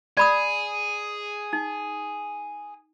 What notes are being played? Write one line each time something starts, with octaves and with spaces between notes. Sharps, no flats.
G#4 D5 B5 D#6
D#4